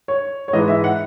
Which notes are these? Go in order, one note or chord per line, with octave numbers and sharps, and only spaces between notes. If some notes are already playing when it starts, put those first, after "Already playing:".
C#5
C#5
G#2 E3 G#3 D#5
E5
F#5